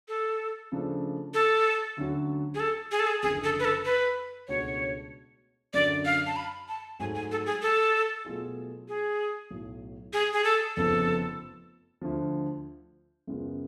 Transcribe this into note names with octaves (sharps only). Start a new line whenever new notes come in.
A4
C#3 F3 A3 D4
A4
D2 D3 F#3 C#4 F#4
G#4
A4
G#4
A4
G#4
F#1 F#2 D3 F3 G#4
A4
B4
A4
B4
C#2 B2 A3 D4 F#4 C#5
F#2 D3 F#3 D5
F5
A5
B5
A5
G#2 F#3 A3 G#5
G#5
A4
G#4
A4
B2 F#3 A3 F4 G#4
G#4
B1 A2 F#3
G#4
G#4
A4
F1 F2 C#3 F3 B3 A4
D2 D3 F3
F#2 C#3 G#3 B3 F4